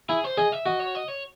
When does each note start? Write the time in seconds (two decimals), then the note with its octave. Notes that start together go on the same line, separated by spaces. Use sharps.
0.09 E4 G#4
0.24 C5
0.38 G#4 D#5
0.53 E5
0.66 F#4 D#5
0.80 C#5
0.95 D#5
1.08 C#5